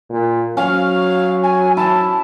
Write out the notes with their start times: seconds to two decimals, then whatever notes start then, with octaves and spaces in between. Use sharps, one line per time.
0.10 A#2
0.57 F#3 C#4 F5
1.43 G#5
1.77 E4 A5